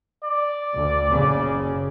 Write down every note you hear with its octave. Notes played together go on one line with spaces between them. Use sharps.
D5
D2
F#1 C#3